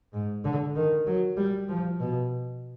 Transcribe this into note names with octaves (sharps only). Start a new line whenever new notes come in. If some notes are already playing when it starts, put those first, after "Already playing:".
G#2
D3
D#3
F#3
G3
F3
B2